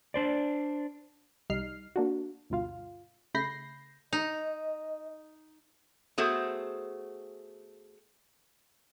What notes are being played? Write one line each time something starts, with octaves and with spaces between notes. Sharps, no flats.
D4 C5 D5
C2 G3 D#4 F6 C7
A#3 D4 F#4
D2 G2 B2 F4 F5
C#3 A3 B5 G6 A#6 C7
D#4 D#5
A3 B3 F#4 G#4 C5